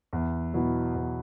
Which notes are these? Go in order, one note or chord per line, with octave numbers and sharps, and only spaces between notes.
E2
B2 F#3 B3 E4
E2